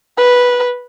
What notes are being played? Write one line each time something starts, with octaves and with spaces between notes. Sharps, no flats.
B4